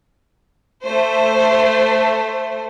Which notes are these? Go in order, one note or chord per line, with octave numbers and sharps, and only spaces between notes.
A3 C5